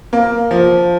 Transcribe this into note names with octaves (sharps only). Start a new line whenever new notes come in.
A#3
F3